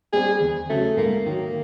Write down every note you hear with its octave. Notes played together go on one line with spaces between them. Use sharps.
G3 C4 G#4
E2
C#3 F#3 A3
G#2 A#3
D#3 F#3 A#3